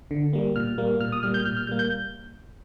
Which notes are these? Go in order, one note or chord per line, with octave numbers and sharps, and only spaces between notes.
D3
G3 A#3
A#2 F6
G3 A#3
A#2 F6
D#6
G3 A#3 F6
G6
A#2 F6
F6
G3 A#3 G6
G6